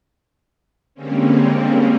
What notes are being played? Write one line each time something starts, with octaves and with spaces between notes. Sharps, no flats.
D3 G3 G#3 A#3 C4 C#4